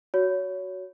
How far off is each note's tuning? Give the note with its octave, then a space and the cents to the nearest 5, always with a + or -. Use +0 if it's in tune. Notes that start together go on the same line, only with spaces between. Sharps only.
F#4 +5 C#5 +20